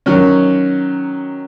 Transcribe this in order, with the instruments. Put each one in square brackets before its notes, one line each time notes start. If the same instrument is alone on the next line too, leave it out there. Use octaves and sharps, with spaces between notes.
[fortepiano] D#3 F#3 C#4